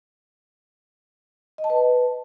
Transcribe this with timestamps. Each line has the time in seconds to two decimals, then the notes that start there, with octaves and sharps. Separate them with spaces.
1.58 D#5
1.64 A5
1.70 B4